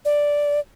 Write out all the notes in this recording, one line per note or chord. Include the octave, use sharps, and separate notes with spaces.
D5